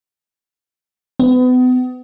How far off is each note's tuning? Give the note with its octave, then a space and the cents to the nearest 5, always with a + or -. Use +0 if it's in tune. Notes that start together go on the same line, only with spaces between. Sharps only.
B3 +35